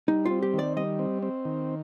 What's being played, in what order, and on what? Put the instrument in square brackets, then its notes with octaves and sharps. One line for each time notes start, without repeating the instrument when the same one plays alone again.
[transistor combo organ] G3 [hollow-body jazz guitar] D#4
[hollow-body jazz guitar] F4
[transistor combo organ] C4
[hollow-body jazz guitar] G4
[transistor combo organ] D#3
[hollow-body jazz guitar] D5
[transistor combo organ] G3 [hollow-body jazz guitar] D#5
[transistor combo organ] C4
C4
D#3